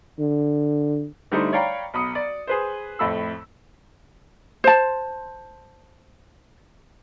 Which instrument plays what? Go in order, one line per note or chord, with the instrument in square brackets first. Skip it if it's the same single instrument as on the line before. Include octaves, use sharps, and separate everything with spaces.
[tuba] D3
[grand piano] D3 G3 A3 D#4 E4 C5
C#5 D5 F5 G5 A#5 B5
B1 B5 D#6 C#7
D5
G#4 B4 C5
F2 A2 A3 B5 E6
[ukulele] C5 A5